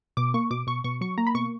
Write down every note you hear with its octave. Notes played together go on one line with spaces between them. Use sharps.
B2 D6
A#3 C#6
B2 D6
B2 C#6
B2 C#6
F#3 C#6
A#3 A#5
B5
B2 C#6